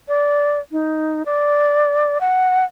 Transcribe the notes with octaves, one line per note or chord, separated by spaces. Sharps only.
D5
D#4
D5
F#5